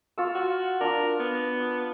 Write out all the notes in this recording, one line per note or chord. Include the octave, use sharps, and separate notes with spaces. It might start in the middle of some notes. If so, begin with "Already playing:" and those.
F4 C#6 E6
F#4
D4 F4 A#4
B3
D6